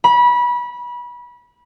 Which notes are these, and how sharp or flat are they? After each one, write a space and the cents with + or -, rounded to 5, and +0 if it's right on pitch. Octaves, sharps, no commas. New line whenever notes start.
B5 -25